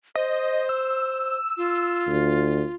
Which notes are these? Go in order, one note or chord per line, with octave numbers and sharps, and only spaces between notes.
C5 D#5
E6
F4
D2